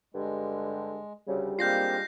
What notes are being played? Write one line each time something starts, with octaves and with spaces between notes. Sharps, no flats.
G2 D3 G#3
D2 C#3 G3
G#3 A#3 C4 D4 F4 G6 A#6 C7